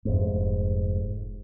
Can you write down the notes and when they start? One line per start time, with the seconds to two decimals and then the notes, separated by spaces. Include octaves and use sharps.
0.05 F1 G#2